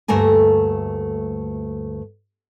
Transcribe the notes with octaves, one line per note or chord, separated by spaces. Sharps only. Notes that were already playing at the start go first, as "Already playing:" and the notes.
D2 G2 A3 A#3 A#4 G#5